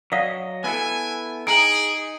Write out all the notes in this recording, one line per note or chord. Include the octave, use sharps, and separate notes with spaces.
F#3 D5 D#5 F5 F#5
B3 E4 A4 G#5
D#4 G#4 G5 A#5 D7 F#7